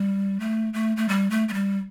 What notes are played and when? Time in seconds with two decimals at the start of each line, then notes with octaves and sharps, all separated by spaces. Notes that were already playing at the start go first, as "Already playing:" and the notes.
Already playing: G3
0.40 A3
0.74 A3
0.97 A3
1.09 G3
1.30 A3
1.48 A3
1.53 G3